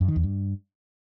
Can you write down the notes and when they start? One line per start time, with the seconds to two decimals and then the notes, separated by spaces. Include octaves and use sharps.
0.01 F#2
0.08 D#3
0.16 E2
0.23 G2